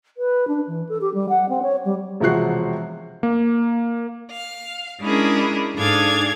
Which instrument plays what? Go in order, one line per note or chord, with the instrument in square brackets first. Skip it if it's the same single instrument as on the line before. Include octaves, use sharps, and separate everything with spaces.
[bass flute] B4
D4
E3
A4
G4
G3
F#5
C4
C#5
G3
[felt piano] E1 C3 F3 F#4 F#6 C7
[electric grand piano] A#3
[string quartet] F5
G#3 C#4 D4 E4 G#4 A#4
G#2 D4 G#4 A4 F5 G#6